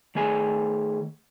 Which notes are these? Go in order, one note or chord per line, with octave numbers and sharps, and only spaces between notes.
D#3 A3 G#4 G#5